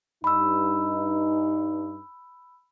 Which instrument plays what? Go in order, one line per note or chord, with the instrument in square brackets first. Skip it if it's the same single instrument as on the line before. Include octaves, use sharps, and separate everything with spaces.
[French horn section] G2 D#4 [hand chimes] B5 E6